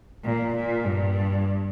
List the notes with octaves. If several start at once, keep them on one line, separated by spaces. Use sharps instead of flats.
A#2
A#2
G2